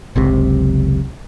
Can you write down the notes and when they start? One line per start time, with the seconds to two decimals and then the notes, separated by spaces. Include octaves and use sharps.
0.16 F#1 C#2 C3